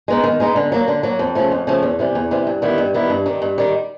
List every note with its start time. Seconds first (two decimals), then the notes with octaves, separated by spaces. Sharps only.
0.08 G#3 B3 D#4
0.24 D#3
0.40 G#3 B3 D#4
0.56 D3
0.72 F#3 A#3
0.88 D3
1.03 F#3 A#3
1.19 F2
1.35 C#3 F3 A3
1.52 F2
1.67 C#3 F3 A3
1.83 E2
1.99 C3 E3 G3
2.15 E2
2.31 C3 E3 G3
2.47 G2
2.62 D#3 G3 B3 E4
2.78 G2
2.94 D#3 G3 B3 E4
3.10 G2
3.26 D#3 G3
3.42 G2
3.58 D#3 G3